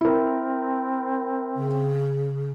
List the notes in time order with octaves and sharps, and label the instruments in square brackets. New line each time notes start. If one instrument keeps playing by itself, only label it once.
[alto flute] C4 [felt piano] E4 A#4
[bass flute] C#3